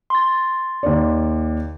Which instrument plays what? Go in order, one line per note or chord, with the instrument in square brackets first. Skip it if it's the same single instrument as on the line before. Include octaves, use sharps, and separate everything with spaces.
[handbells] C6 A6
[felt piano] D#2 D5